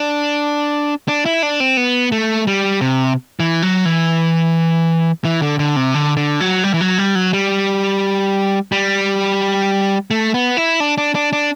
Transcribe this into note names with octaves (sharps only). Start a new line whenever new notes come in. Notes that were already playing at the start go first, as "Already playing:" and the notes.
Already playing: D4
D4
E4
D4
C4
B3
A3
G3
C3
E3
F#3
E3
E3
D3
D3
C3
D3
D3
F#3
G3
E3
F#3
G3
F#3
G3
G3
A3
B3
E4
D4
D4
D4
D4